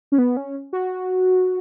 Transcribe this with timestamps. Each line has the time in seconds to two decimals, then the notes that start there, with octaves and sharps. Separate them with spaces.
0.12 C#4
0.18 B3
0.37 C#4
0.73 F#4